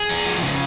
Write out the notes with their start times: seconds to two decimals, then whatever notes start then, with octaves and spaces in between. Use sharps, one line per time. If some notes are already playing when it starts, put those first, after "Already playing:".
Already playing: G#4
0.09 F2
0.26 F3
0.43 C#3